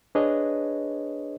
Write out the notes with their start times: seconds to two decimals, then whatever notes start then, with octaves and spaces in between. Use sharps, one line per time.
0.15 D4 G#4 B4 C#5 D#5